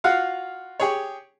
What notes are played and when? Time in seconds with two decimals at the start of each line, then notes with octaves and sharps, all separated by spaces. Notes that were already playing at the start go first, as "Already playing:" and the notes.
0.04 F4 F#4 F5 F#5
0.80 G4 G#4 C#5